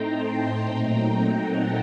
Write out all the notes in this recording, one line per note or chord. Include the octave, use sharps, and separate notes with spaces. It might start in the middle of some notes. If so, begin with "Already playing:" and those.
Already playing: A2 A3 C4 D#4 G5 A5 A#5 C6
A5 C6
A#2 F#3 A3 C4 D#4 G5 A#5
G5 A#5
F#5 A5